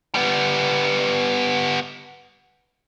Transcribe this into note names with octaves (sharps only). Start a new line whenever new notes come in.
G3 B3